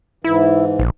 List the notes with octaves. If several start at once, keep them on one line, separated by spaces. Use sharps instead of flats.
G#2 E3 E4
A#1